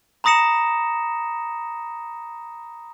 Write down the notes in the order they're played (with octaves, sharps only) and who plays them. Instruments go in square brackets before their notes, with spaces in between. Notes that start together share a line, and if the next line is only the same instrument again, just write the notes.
[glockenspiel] A#5 B5 D#6 A#6 C#7 E7